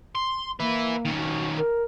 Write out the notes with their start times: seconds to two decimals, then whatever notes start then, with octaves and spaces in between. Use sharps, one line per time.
0.15 C6
0.60 A#3 B4 E5
1.05 D#3 C#4
1.17 F#4
1.56 A#4